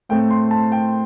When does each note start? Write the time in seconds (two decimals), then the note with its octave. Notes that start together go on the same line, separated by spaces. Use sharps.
0.09 A2 A3 C4 G5
0.31 C6
0.51 A5
0.72 G5